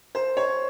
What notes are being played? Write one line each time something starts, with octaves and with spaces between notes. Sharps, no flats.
C5
C#5